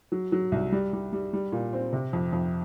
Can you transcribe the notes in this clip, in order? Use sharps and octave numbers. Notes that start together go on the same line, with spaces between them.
F#3
F#3
C2
G3
G3
G3
G3
A#2
C4
C3
F2
F2